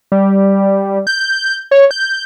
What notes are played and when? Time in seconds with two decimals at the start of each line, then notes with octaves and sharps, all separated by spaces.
0.12 G3
1.07 G6
1.71 C#5
1.91 G6